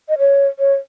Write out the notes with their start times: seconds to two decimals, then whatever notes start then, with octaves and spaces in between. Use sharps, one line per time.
0.09 D#5
0.19 C#5
0.59 C#5